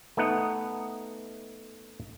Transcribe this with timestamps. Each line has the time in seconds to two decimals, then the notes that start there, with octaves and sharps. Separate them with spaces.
0.17 A3 B3 D#4 F#5